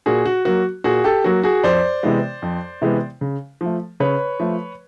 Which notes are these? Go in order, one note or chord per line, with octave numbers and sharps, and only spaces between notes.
A#2 F#4 G#4
F#4
F#3 A#3 F#4
A#2 F#4 G#4
G4 A4
F#3 A#3 F#4
F#4 G#4
F2 C5 D5
C3 E3 G#3 B3
F2
C3 E3 G#3 B3
C#3
F3 A3
C#3 B4 C#5
F3 A3